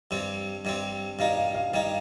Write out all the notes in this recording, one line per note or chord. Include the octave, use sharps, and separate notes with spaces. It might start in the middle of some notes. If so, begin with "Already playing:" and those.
G2 G3 C4
G2 G3 C4
G2 G3 D#4 F5
F5
F5
G2 G3 D#4 F5